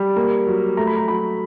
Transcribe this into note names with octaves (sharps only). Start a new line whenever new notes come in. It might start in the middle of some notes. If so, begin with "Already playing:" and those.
Already playing: G3
A#3
F#3
A3 A#5
B5
A#5
F#3 B5